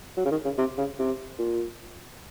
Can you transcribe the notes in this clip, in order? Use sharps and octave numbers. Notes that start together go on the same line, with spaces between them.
F#3
C#3
D#3
C#3
C3
C#3
C3
A#2